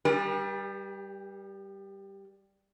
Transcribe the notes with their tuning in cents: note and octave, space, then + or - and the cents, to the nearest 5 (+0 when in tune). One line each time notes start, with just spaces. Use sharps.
G3 +0 G4 +40 B4 -45